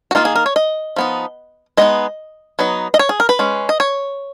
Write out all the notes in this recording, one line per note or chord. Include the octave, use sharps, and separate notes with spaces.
F#4
D#3 A#3 D#4 F4
G#4
A#4
C#5
D#5
F3 B3 D#4
G#3 B3 D#4 D#5
F#3 B3 D#4
D#5
C#5
G#4
A#4
B4
G#3 C#4
D#5
C#5